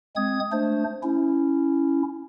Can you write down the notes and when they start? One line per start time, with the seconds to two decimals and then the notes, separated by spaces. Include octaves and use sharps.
0.16 G#3 C4 D#6 G#6
0.52 A3 D4 C5
1.03 C#4 E4